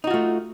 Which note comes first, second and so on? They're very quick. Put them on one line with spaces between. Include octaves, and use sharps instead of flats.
D#4 F#4 F4 A3